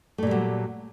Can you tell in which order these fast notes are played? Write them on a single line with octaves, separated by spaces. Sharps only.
A3 A#2 G3 F#3